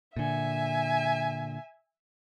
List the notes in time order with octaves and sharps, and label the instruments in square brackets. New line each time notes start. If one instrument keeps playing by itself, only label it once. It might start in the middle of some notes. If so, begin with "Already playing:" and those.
[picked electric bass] A#2 D3 [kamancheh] E5 G#5